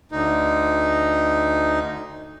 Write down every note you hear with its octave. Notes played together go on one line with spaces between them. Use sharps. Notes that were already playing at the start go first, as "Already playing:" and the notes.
D2 D#4